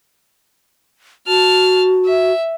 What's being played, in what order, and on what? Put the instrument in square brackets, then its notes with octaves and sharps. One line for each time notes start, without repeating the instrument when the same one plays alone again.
[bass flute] F#4 [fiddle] A5 F6
[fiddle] E5